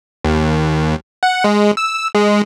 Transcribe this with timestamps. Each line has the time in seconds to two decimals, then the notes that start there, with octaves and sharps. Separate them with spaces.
0.24 D#2
1.23 F#5
1.44 G#3
1.77 E6
2.15 G#3